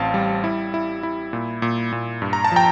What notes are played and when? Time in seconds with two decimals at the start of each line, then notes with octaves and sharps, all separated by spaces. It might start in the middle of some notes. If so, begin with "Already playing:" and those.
Already playing: A1 C4 F5 A5
0.14 G3
0.44 E4
0.74 E4
1.03 E4
1.33 A#2
1.62 A#2
1.92 A#2
2.22 G2
2.33 A#5
2.45 A5
2.52 F3 G5 A#5